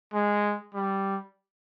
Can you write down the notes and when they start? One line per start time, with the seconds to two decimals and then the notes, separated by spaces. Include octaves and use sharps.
0.13 G#3
0.74 G3